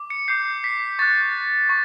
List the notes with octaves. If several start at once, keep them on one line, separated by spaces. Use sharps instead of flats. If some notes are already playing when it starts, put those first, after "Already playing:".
Already playing: D6
C#7
D6 G6 C7
B6
C#6 F#6 A6
C#6